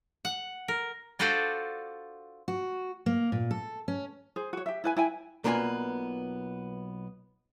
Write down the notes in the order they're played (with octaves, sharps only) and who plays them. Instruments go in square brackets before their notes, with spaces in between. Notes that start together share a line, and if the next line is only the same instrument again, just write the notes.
[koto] F#5
A#4
D4 F4 F#4 A4 C5 D5
[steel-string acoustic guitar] F#4
A#3
A#2
A4
C#4
[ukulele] G#4 C5
F#4 C#5
G4 E5
E4 B4 G#5
E4 G5 G#5
[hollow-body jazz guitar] B1 A#3 B3 F4 D5 G#5